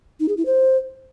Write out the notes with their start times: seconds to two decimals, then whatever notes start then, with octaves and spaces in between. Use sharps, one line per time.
0.20 D#4
0.29 G#4
0.37 E4
0.46 C5